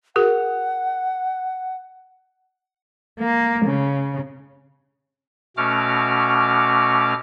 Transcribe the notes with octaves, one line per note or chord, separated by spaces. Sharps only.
F#4 G#4 A#4 F#5
A#3
C#3
B2 A3 C#4 F#4 D6 F6